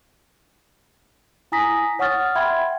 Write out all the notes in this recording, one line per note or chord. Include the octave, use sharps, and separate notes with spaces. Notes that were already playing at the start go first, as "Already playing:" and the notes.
E4 G#5 A#5 D#6 A#6 B6
C#5 F#5 C#6 D#6 F6 A6
E5 F#5 G5 B5 C6 G#6